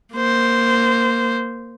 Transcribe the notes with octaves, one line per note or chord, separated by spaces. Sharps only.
A#3 C5